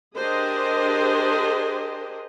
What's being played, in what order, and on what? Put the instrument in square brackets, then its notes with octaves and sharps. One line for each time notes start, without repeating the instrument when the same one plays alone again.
[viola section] D4 G4 G#4 A#4 C5 D#5